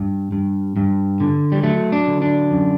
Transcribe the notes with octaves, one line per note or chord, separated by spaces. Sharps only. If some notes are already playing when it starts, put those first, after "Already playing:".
Already playing: G2
G2
G2
D3
G3
F#3 A3
D4
D3
D4
F#2